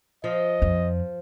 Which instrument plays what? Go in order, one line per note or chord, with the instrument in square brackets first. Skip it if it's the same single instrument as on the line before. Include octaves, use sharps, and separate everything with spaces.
[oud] F3 [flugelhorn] D#5
[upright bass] F2